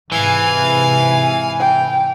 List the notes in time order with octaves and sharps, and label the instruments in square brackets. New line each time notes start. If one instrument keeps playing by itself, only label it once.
[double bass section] G#2 C3 [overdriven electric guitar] E3 [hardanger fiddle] F5 G#5
[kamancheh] G5